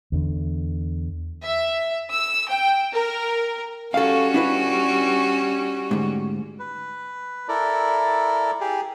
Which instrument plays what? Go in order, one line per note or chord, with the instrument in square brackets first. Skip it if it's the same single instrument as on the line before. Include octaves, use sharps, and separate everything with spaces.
[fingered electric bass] E2 D3
[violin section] E5
E6
G5
A#4
[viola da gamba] G3 C#4 F#4 [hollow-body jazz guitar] A4 F5
[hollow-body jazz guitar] D4 E4 B4
D2 G#2
[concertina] B4
E4 A4 A#4 D5
G4 G#4